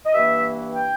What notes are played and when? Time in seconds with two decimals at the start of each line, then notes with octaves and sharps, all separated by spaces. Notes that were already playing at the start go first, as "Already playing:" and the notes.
0.06 D#5
0.14 G2 E3 A#3 E5
0.75 G5